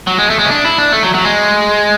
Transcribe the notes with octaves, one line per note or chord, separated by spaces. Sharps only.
F#3
G#3
A3
G#3
C#4
D4
E4
D4
A3
F#3
F#3
G#3